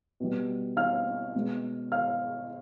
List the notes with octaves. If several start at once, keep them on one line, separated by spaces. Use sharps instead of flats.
B2 G3
F5 F6
B2 G#3
F5 F6